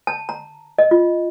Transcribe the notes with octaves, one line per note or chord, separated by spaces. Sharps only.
A5
A#5
D#5
F4